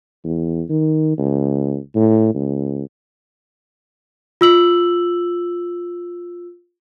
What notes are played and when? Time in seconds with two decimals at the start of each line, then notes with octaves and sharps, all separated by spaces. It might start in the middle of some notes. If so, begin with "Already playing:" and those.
0.24 E2
0.69 D#3
1.18 C#2
1.95 A2
2.34 C#2
4.41 F4 E6 F#7